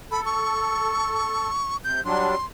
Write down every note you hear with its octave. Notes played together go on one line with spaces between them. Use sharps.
A4 B5
C#6
C3 G6
F#3 G3 D4 C6